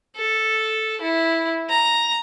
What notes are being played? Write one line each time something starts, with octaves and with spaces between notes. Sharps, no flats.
A4
E4
A#5